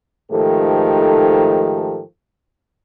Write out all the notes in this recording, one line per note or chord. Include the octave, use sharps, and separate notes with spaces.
G#2 D#3 F3 A3 G4 A4